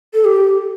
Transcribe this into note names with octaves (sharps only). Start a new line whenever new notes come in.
A4
G4